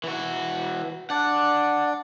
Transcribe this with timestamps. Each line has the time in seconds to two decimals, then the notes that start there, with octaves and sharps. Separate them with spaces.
0.04 E3 F#4
1.10 D4 D5 F#5